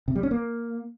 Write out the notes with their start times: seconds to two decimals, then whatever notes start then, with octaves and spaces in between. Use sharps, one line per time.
0.08 C3
0.15 G3
0.23 C#4
0.31 A#3